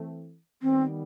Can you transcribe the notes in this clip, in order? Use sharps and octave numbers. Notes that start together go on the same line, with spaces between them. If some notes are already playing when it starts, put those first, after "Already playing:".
Already playing: E3 A3 C4
D#3 G3 B3 C4